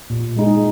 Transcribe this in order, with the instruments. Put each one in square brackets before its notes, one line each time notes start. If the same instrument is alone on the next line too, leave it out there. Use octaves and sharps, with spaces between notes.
[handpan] A#2
G#3 D#4 G#4